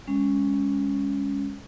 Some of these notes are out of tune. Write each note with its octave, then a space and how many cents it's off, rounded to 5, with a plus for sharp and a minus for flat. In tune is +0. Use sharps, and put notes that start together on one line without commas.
G#3 -30 C#4 +0